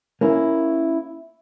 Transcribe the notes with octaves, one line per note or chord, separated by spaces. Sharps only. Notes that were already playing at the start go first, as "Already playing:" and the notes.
A#3 C#4 E4